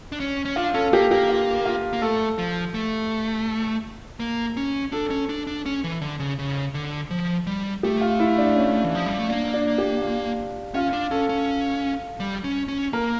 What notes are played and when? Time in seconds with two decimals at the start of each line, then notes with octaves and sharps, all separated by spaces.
0.12 D4
0.20 C#4
0.45 C#4
0.56 D4 F4
0.74 C#4 A4
0.93 A#3 G4
1.11 A#3 G4
1.29 F4
1.65 F4
1.93 A#3
2.02 A3 A4
2.38 F3
2.74 A3
4.20 A#3
4.57 C#4
4.92 D4 A4
5.10 C#4
5.29 D4
5.47 D4
5.66 C#4
5.84 E3
6.02 D3
6.19 C#3
6.39 C#3
6.74 D3
7.11 F3
7.47 G3
7.83 A3 G4
8.01 F4
8.20 E4
8.38 D4
8.56 C#4
8.84 E3
8.95 F3
9.06 G3
9.18 A3
9.29 A#3 D4
9.54 D4
9.78 G4
10.02 F4
10.74 C#4 F4
10.93 D4
11.11 C#4 A4
11.29 C#4
12.20 G3
12.44 C#4
12.68 C#4
12.93 A#3 A#4